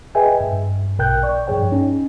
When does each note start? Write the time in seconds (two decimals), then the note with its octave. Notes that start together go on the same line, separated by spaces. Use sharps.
0.15 G#4 B4 D#5 E5 G5 G#5
0.41 G2
0.98 A#1 B2 A#4 G5 F#6 G6
1.23 D5 C#6
1.47 G2 F3 G#4 C#5 G5
1.72 C#4 D#4